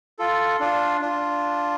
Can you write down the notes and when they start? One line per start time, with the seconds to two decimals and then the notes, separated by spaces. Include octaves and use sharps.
0.19 F4 A4
0.60 D4 F4
1.01 D4 F4